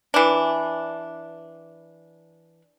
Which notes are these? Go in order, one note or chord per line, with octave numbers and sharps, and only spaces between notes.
E3 D4